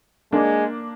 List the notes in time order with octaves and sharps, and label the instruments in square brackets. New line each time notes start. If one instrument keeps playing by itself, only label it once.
[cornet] G#3 [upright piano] A#3 D4